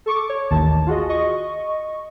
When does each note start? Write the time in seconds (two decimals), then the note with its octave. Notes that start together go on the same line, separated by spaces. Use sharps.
0.06 A4 C#6 D6
0.29 C#5
0.51 A1 D#2 D#3 A5
0.87 F4 F#4 G#4 D#5
1.09 D#5 C#6